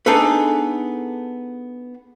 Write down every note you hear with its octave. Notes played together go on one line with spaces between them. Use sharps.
B3 D4 D#4 G#4 A4 B4